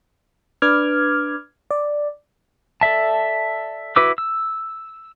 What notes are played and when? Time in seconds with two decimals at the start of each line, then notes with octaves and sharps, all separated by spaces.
0.62 D4 B4 D6 F6 G#6
1.71 D5
2.81 A4 D5 E5 A5
3.96 E4 F#4 B4 D6 E6
4.18 E6